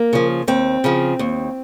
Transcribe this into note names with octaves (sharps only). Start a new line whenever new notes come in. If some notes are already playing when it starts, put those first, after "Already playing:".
Already playing: A#3
C#3 F3
D#2 C4
C#3 F3
D#2